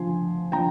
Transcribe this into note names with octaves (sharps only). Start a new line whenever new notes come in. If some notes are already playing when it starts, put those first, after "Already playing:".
Already playing: D3 F3 G#5 C6
D3 F3 G5 A#5